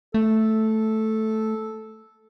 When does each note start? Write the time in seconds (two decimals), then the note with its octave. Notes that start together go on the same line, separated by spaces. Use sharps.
0.14 A3 A4